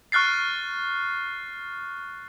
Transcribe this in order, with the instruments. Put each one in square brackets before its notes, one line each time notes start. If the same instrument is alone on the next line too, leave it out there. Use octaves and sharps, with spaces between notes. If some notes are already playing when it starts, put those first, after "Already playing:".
[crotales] C#6 F6 F#6 A6 C7